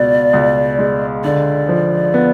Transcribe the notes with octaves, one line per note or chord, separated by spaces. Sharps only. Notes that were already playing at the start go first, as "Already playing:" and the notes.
Already playing: C#2 B2 D5
C#2
G#3
D3 D5
F3
B3